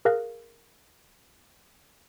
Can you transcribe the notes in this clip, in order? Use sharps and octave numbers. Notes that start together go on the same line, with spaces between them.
G#4 A#4 F5 F#6 A#6